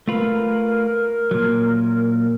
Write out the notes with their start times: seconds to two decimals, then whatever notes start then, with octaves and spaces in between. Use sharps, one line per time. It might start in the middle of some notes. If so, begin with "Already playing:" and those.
0.08 A3 F4 A#4 B4
1.31 A#2 F#3